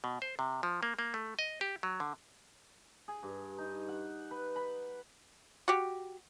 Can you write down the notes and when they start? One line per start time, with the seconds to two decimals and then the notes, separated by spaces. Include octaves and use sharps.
0.04 B2
0.22 C5
0.39 C3
0.63 F3
0.83 A#3
0.99 A#3
1.14 A3
1.39 D#5
1.61 G4
1.83 F#3
2.00 D3
3.08 G#4
3.23 G2
3.58 D#4
3.88 F#5
4.31 B4
4.56 B5
5.68 F#4 G4